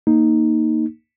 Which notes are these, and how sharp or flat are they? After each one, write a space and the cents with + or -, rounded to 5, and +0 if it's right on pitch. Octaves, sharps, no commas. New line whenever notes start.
A#3 -5 D#4 +0